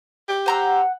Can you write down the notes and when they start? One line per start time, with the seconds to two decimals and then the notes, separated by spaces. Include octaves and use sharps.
0.29 G4
0.46 C5 F#5 A#5 E6